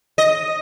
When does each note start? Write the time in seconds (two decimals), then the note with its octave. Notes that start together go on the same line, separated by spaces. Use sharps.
0.18 D#5